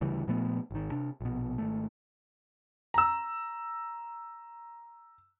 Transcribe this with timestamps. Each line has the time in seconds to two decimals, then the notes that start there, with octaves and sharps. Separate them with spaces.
0.01 D2 C#3 E3 G3
0.28 A#2 F3 A3 B3
0.71 G#1 D#3
0.92 C3 D4
1.21 A#1 B2
1.58 G#1 A3
2.94 A#5 E6